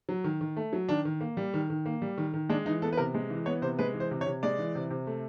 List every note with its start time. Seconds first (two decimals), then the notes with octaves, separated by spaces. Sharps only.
0.09 F#3
0.24 D#3
0.41 D#3
0.57 A3
0.73 F#3
0.89 D#3 D4
1.05 D#3
1.21 A#3
1.37 G3
1.54 D#3
1.70 D#3
1.86 A#3
2.02 G3
2.18 D#3
2.34 D#3
2.49 G#3 D4
2.66 E3 D#4
2.82 B3 A4
2.93 B4
2.97 C3 A#4
3.15 G#3
3.30 E3
3.46 B3 C#5
3.62 C3 C5
3.79 G#3 B4
3.94 E3
4.00 C5
4.11 C3
4.21 C#5
4.26 C3
4.43 G#3 D5
4.59 E3
4.75 C3
4.90 C3
5.07 A3